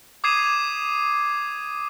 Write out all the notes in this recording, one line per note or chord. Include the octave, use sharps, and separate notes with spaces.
D6 D#6 G#6 C7 D#7 E7